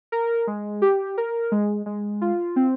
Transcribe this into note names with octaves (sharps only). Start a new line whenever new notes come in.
A#4
G#3
G4
A#4
G#3
G#3
F4
C4